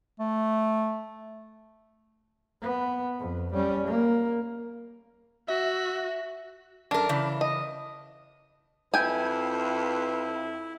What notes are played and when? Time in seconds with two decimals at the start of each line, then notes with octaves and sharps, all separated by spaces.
0.19 A3
2.61 B3
3.19 F2
3.54 G3 C#4
3.87 A#3
5.48 F#4 E5
6.91 F#2 D4 A#4
7.09 C#3 E3
7.41 D#5
8.94 F2 E4 B4 G5 G#5